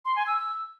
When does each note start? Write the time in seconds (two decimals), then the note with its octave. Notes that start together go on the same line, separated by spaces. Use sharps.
0.05 C6
0.16 G#5
0.27 E6